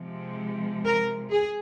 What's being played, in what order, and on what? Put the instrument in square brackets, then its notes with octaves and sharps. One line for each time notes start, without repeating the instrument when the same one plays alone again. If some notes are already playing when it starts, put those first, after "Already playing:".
Already playing: [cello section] C3 F3 G#3
A#4
G#4